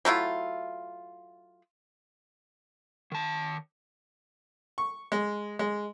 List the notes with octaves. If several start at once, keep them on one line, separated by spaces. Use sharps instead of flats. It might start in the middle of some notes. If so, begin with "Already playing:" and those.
F#3 A3 E4 F4
D#3 A5
C#6
G#3
G#3